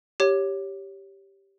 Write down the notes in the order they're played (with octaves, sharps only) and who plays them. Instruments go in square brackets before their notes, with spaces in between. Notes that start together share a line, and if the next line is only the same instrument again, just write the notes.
[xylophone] G4 C#5